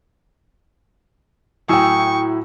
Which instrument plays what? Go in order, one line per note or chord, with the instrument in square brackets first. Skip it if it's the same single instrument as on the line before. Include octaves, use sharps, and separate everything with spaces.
[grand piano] A2 G#5 E6 [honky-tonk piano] F#3 E4 [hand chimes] G5 D#6 [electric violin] C#6